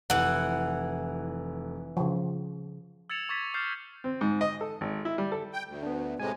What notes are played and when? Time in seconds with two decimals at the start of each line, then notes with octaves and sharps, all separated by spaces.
0.10 F1 E3 F#5
1.97 C#3 F3
3.10 E6 G#6 A6 C#7 E7 F7
3.29 C#6 D6 G#6 A6 B6
3.54 C#6 D6 F6 G6 A6 C7
4.04 C4
4.21 G#2
4.41 D#5
4.61 A4
4.81 G#1
5.05 E4
5.18 G3
5.32 A4
5.53 G5
5.67 D2
5.83 B3 D4
6.20 A2 C3 G#3 G#5